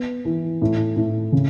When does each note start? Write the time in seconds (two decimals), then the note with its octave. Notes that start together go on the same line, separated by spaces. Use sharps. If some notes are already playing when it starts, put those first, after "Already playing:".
Already playing: B3
0.25 E3
0.62 A2
0.96 A2
1.32 C#3